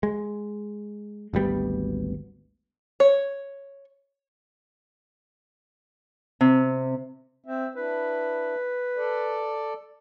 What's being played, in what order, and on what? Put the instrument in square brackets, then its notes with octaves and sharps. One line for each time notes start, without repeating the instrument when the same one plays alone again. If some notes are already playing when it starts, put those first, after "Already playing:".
[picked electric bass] G#3
G#1 D2 G3 B3
[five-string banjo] C#5
[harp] C3
[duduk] C4 [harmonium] E5
[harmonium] D4 E4 [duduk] B4
[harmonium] A4 D5